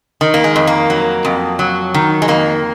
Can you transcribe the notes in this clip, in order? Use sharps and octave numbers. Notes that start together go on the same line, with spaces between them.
D#3
A#3
G#3
F2
A#3
F#3
F2
F#3
D#3
G#3
F2 A#3